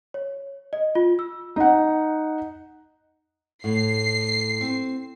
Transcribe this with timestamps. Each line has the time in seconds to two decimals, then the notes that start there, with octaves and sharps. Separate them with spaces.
0.14 C#5
0.73 D#5
0.95 F4
1.19 E6
1.56 D#4 F#5
3.64 A2 C7
4.61 C4